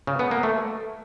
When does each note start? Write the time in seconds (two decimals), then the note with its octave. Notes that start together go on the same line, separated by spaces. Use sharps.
0.07 C#3
0.19 B3
0.31 A#3
0.43 A3